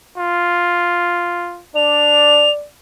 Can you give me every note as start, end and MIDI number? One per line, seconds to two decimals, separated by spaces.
0.18 1.61 65
1.76 2.46 62
1.76 2.66 74
1.76 2.50 101